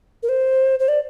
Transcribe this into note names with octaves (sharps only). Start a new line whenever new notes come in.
A#4
C5
C5
D5